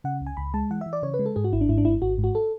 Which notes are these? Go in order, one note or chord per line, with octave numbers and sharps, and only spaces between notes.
C#3 F#5
C#2
G#5
C#2 B5
G#3 A5
E3 F#5
E3 E5
D5
C#3 C#5
B4
G#3
A4
G#2 G#4
F#4
G#1 E4
D4
G#2 E4
D4
G#1 E4
G#1 F#4
G#2
F#4
A4